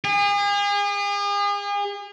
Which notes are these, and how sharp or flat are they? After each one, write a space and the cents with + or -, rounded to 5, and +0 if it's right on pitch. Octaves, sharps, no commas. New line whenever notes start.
G#4 -40